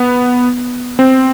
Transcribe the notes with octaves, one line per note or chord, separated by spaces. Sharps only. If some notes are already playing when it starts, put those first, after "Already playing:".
Already playing: B3
C4